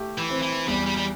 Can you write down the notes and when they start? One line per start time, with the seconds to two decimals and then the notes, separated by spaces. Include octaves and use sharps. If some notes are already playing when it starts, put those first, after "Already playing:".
Already playing: A3 G4
0.18 E3
0.30 C4
0.42 E3
0.68 E2 G3
0.86 G3
0.97 G3